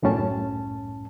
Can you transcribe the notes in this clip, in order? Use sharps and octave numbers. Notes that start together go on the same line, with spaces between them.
C2 F#2 A2 C#4 A5